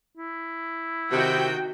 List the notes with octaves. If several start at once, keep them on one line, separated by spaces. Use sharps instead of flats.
E4
C3 D#3 F#4 G5